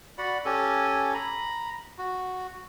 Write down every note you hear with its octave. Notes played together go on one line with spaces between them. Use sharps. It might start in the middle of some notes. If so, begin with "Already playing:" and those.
F#4 D5 F#5 B5
C#4 G4 A4 G#5
A#5 B5
F#4